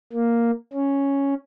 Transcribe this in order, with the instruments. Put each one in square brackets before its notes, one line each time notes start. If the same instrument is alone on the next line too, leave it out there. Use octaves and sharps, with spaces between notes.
[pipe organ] A#3
C#4